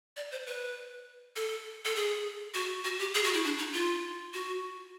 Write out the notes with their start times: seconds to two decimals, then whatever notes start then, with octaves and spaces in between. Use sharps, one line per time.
0.17 D5
0.32 C5
0.47 B4
1.36 A4
1.85 A4
1.96 G#4
2.54 F#4
2.84 F#4
2.99 G4
3.15 G#4
3.24 F#4
3.34 E4
3.44 D4
3.58 D#4
3.73 F4
4.34 F#4